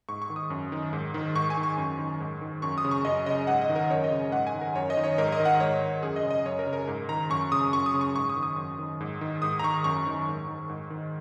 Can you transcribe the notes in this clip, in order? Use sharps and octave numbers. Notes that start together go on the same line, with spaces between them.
G#2 C#6
C#6
D#3
D#6
F#2
D#3
G#2
D#3
G#2 C#6
G#5
D#3
C#6
F#2
D#3
G#2
D#3
F#2 C#6
D#6
C#3
C#6
F#2 D#5
C#3 D#5
G#2 F#5
D#5
D#3
A#4
F#2 C#5
D#5
C#3
G#2 F#5
G#5
D#3
A#4
F#2 C#5
D#5
D#3
C#5
G#2 A#4
D#5
D#3
F#5
G#2 C#5
D#3
F#2 G#4
D#5
C#3
D#5
F#2 C#5
A#4
C#3
A#4
G#2
D#3 A#5
F#2 C#6
C#3 D#6
F#2 C#6
D#6
C#3
C#6
G#2 C#6
D#6
D#3
D#6
F#2
D#3
G#2
D#3
G#2 D#6
A#5
D#3 C#6
F#2 C#6
D#3
G#2
D#3
G#2
D#3